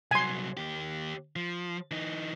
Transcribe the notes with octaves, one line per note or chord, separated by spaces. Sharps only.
C2 F#3 G#5 C6
D#2 G4
F3
E3 D#4